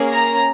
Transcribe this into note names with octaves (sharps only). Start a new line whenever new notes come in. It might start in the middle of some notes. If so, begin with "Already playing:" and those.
Already playing: A#3 C#4 G#4
A#5